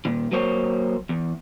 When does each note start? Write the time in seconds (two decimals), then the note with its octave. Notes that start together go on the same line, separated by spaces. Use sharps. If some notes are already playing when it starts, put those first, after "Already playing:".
0.05 A#2 D#3
0.31 F#3 A#3 C5 C#5
1.09 E2